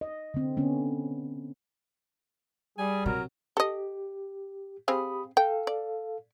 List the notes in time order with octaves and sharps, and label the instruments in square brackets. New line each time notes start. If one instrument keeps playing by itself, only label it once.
[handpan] D#5
D3 C4
D3 B3 C#4
[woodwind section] G3 [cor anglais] G#4 [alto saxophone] G#5
[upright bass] C3 [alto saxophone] F#3 [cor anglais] A#4
[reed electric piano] G4 [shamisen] A4 D#5
[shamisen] C4 G#4 F5 [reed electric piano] G4 B5 D#6
[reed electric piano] A4 F5 [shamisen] G5
[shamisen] D5